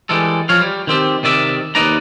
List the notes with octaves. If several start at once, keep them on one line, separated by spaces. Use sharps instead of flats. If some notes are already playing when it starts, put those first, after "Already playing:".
E3 G3 G#3 A4
F3 C#5 F5
G3
D#3 C4 G4
C3 D#3 D5 E5
D#2 D#4 B4 D5 A#5